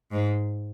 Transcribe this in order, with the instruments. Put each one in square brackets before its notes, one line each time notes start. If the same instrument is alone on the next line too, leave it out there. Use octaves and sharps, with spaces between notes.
[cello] G#2